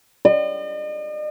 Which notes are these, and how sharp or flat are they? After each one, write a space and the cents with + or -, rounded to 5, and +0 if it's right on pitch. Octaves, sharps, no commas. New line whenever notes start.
D#5 -45